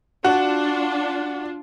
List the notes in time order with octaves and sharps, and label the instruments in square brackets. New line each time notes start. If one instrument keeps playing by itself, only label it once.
[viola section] D4 F4 [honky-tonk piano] F#4